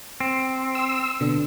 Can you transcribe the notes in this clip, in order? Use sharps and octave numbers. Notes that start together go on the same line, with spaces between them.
C4
E6
B2 D3 D4